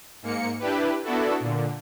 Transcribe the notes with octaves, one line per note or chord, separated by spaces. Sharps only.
G#2 A#3 C#7
D4 E4 G4 B4
B3 D4 E4 F#4 A4
A#2 D3